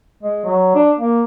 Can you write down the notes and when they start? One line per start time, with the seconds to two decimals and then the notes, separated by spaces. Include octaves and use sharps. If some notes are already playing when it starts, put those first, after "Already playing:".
0.23 G#3
0.45 F#3
0.75 D4
0.99 A#3